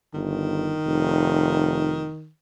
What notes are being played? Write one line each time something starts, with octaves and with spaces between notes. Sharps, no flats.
G1 D#3
F1